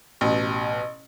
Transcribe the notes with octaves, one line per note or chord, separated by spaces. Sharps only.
A1 B2